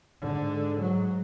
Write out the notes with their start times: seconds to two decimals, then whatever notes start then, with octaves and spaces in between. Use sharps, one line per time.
0.23 G#2 D3
0.81 F#3